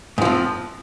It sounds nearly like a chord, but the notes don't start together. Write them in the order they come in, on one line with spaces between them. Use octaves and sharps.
G#2 F3 F2